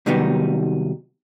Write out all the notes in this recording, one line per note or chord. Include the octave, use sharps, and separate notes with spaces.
C3 D#3 F#3 G3 B3 D#4